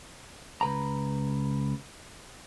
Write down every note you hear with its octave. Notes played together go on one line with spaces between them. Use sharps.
C#2 B4 A#5